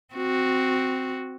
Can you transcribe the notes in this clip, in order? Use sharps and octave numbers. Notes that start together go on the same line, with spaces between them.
C4 F#4